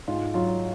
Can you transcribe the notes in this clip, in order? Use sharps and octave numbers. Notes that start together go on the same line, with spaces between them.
G#2 F4
F#3 F4